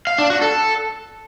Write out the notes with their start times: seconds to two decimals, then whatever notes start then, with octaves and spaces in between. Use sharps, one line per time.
0.07 F5
0.18 D4
0.30 F#4
0.42 A4